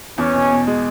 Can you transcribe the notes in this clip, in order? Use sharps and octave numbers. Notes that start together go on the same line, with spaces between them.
E2 C#4
B2
B2
G#3